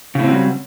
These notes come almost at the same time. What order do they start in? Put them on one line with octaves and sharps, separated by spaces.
C#3 A2 C4 F#3 G3